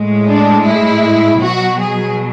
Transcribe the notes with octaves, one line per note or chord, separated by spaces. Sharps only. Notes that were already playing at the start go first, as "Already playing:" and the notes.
Already playing: A2 G#3
D4
E4
B2 F#3 F#4
G#4